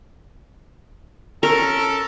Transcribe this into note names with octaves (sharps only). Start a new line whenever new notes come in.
C#4 A4 A#4